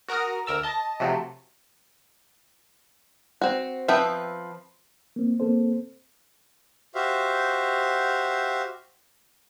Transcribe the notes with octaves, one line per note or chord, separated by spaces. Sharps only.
F#4 A#4 A#5 D#6 F6
D2 A#4 E6 A6
D#5 A5
C3 F3 F#3 A3
C4 F#4
F3 C4 B4 E5 G5
A#3 C4
A#3 C4 A4 C5
F#4 G4 C5 E5 F5